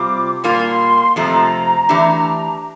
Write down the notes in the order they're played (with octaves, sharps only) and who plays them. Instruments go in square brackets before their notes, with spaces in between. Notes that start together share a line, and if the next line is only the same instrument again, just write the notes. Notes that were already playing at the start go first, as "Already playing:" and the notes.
Already playing: [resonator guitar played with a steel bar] C3 G3 C4 F4 [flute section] D6
[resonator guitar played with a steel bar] A#2 G3 A#3 F4 [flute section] C6
[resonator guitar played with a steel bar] F2 C3 F3 A3 [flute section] A#5
[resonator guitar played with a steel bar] E3 A3 D4 G4